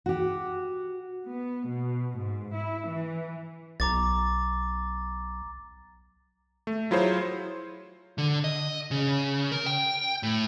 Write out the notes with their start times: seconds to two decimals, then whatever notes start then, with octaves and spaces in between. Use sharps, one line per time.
0.06 F#4 G4
1.26 B3
1.68 B2
2.18 G#2
2.54 E4
2.87 E3
3.80 B1 A#5 D6 A6
6.67 A3
6.91 F#3 E4 F4 G#4 C5 C#5
8.18 D3
8.44 D#5
8.91 C#3
9.52 A#4
9.66 G5
10.23 A2